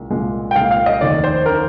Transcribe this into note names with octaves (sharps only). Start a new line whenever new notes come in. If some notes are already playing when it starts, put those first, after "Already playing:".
Already playing: C2 A#2 G#3
C2 A#2 G#3
G5
C2 A#2 G#3 F5
F5
D#5
F1 D#2 D#3 D5
C5
D#3 A#4